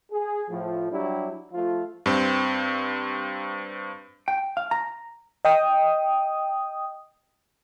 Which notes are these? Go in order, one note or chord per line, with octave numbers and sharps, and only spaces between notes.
G#4
A2 F3
F#3 G3 D4 E4 G4
F3 A3 F4
G2 C4
G5
F5
A#5
D#5 G5 D#6